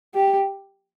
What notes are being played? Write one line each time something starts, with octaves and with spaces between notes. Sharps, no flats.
G4